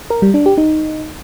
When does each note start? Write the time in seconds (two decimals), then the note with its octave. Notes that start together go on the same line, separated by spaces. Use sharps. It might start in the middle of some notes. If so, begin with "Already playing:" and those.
0.10 A#4
0.22 G3
0.34 D4
0.46 G4
0.58 D#4